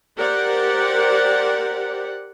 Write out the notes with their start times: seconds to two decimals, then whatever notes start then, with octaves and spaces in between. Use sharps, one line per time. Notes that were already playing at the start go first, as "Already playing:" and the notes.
0.17 G4 A#4 C5 D5 F#5